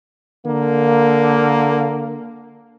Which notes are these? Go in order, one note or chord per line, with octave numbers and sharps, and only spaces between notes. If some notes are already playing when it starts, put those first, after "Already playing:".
D3 A#3